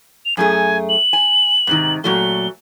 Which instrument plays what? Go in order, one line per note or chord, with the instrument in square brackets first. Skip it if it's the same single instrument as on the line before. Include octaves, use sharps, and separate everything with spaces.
[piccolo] F7
[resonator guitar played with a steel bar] F#2 A3 G#4 [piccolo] G#5
[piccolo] F#7
[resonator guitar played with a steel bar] G#5
G#2 C3 D#3
[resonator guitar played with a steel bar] A#2 F#3 A3 [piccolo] G7